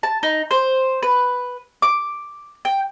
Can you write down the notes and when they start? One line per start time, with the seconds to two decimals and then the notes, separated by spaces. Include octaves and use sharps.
0.03 A5
0.23 D#4
0.51 C5
1.03 B4
1.82 D6
2.65 G5